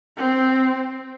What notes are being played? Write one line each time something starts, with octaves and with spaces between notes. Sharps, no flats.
C4